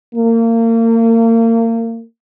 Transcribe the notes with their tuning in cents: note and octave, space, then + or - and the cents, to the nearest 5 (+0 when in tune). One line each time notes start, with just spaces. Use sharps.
A#3 -35